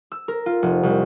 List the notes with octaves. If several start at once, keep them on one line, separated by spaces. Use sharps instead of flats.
E6
A#4
F4
F1
C2